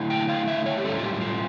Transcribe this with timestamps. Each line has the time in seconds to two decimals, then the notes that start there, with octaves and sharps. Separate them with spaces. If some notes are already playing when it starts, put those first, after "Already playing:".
Already playing: D3 A3 E4
0.10 G5
0.29 F5
0.48 E5
0.66 C#5
0.77 G4
0.84 A2 G3 C#4 A4
0.98 F4
1.03 G4
1.14 G4
1.21 F4